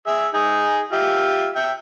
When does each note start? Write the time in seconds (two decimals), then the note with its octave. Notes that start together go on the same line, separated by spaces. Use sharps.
0.07 G#4 E5 E6
0.34 D#4 G#4
0.93 F4 G4 E5
1.56 E5 G5